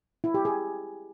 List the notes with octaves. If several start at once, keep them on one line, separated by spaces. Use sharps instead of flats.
E4
G4
G#4